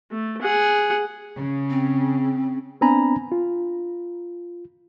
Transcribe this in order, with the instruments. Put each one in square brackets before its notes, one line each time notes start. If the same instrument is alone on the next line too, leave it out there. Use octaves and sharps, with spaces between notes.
[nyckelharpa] A3
G#4 F#5
[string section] C#3
[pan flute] C4
[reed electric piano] B3 C4 D4 G#5 A#5 B5
F4